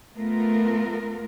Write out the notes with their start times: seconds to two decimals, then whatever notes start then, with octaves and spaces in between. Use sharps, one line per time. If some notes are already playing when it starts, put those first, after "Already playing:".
0.17 A3 B3 F4 A#4